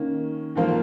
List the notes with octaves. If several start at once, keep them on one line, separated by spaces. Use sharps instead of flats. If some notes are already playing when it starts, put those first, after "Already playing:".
Already playing: D#3 A#3 C#4
G#2 F3 A#3 F4